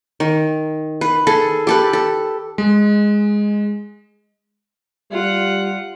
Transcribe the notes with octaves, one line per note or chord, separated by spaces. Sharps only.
D#3
B4
G#4 A4
G4 A4 B4
A4
G#3
G3 F4 F#5